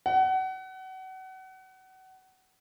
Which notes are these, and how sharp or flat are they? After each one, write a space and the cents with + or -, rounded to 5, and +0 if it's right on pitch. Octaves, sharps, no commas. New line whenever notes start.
F#5 +30